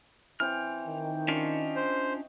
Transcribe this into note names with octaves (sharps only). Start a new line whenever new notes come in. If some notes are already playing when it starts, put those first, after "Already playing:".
E3 C4 G5 F6
D#3
C#4 D4 F4 D#5 C#6
C5